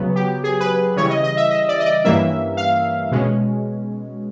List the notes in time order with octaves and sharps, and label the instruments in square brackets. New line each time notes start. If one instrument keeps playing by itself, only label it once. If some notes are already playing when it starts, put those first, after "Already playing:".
Already playing: [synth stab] C#3 F#3 B3
G4
G#4
B4
C#3 E3 G3 C#5
D#5
D#5
E5
D#5
D5
D#5
D5
G2 E3 G3 A#3 C#4 E5
F5
B2 G#3 C#4